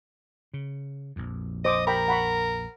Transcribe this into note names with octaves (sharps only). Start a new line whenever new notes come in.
C#3
A#1 F2
C5 D#5 D6 D#6
A#4 G5 A#5 B5
F#5 B5 C#6